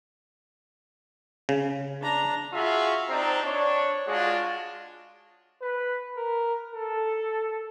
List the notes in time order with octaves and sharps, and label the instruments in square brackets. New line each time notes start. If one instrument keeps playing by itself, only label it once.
[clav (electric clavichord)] C#3
[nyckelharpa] D4 A#5
[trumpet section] F4 F#4 G#4 E5
C4 D4 D#4 A#5
D4 C#5
G#3 D4 F4 F#4
[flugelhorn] B4
A#4
A4